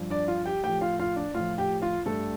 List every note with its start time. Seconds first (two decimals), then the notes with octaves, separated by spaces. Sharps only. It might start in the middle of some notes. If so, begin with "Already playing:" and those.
Already playing: G2 F3
0.10 D4 D5
0.28 F4 F5
0.46 G4 G5
0.64 A2 F3 G4 G5
0.81 F4 F5
1.00 F4 F5
1.16 D4 D5
1.34 A2 F3 F4 F5
1.58 G4 G5
1.82 F4 F5
2.06 G2 G3 A3 A4